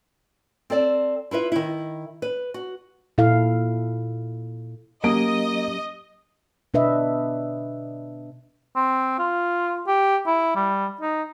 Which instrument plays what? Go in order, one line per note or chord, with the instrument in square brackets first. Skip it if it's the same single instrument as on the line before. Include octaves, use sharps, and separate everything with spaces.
[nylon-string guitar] C4 A4 D5
E4 F4 B4 E5
D#3 E4
B4
F#4
[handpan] A#2 E4 A4 F5
[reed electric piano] F#3 C#4 G4 [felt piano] A#3 D7 [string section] D#5
[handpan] B2 D4 B4 D#5 E5
[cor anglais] C4
F4
G4
E4
G3
D#4